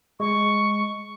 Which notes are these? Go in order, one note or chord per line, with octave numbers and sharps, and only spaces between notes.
G#3 C#6